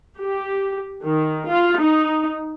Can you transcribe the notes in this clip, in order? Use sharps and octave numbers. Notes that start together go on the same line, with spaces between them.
G4
D#3
F4
D#4